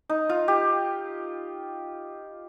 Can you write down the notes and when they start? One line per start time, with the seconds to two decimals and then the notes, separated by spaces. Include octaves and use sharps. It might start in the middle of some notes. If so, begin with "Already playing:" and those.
0.09 D#4
0.29 F4
0.48 G4